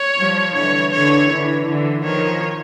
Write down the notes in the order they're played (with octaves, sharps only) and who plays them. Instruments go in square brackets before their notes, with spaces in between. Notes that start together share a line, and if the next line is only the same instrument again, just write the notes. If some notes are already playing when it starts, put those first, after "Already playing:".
Already playing: [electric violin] C#5
[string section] F3 G3
[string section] D3 E3 [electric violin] C#5
[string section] D3 E3 [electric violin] C#5
[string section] D3 E3
D3 E3
[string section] D#3 F3 [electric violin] C#5